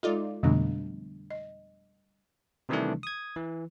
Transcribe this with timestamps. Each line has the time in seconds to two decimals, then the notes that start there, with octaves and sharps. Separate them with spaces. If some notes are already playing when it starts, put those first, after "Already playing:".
0.03 G#3 D#4 F4 A4 D5
0.43 F2 B2 D3 G3 A3 D4
1.30 D#5
2.69 C3 D#3 E3 G3 A3 D4
3.03 D#6 G#6
3.36 E3